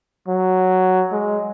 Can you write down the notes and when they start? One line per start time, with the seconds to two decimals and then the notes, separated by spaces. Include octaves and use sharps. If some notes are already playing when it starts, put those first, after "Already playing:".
0.28 F#3
1.12 G#3